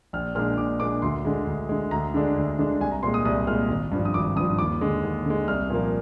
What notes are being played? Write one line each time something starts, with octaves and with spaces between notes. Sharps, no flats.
A#1 F6
A#2 G#3 D4 F6
A#1 D6
A#2 G#3 D4 D6
D2 C6
D3 G#3
D2
D3 G#3
D2 A#5
D3 G#3 D4
D2
D3 G#3 D4
C2 G#5
A#5
A#2 G#3 C6
D#6
C2 D#6
A#2 G#3 F6
G#1
G2 F3
D#6
G#1 D6
G2 F3 D#6
D#2 D6
D3 G#3
D#2
D3 G#3
C2 F6
A#2 F3 A#3